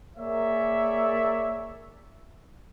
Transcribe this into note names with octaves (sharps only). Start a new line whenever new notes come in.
A#3 G#4 A#4 C#5 D5 E5